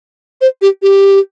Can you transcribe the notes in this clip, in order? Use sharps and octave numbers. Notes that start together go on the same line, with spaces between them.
C5
G4
G4